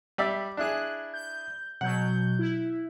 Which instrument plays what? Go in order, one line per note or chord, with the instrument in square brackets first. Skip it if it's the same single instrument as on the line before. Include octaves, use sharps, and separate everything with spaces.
[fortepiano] G3 D5 E5
[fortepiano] D4 E4 G#4 [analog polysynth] F#6
[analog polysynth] G6
[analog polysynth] B2 F#3 G6 [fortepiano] F#5
[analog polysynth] E4